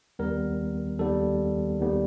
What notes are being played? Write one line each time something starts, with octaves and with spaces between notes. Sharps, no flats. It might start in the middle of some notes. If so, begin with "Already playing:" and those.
D#2 D#3 G3 B3 A#4
D#2 D#3 G3 B3 A4
D#2 D#3 G3 B3